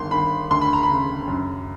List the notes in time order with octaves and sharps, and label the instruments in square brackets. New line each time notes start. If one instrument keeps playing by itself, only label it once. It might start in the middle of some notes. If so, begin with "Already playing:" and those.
Already playing: [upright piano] G1 D#3 C6
D#3 B5
D2 C6
B5
A#5
B5
C#3
F#2